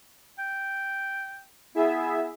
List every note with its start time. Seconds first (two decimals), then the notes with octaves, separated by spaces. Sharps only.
0.38 G5
1.75 B3 E4 G#4 E5